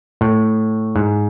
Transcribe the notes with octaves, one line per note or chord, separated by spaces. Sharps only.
A2
G#2